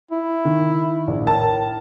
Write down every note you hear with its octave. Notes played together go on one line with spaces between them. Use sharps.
E4
D#3
A#1
A2 A#4 A5